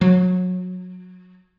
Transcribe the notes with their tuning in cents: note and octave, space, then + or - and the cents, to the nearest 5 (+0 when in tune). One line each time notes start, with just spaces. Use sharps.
F#3 -25